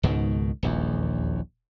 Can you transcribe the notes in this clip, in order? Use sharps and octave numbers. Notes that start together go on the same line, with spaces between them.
C#2 G#2 B2 D#3
D#1 A#1 E2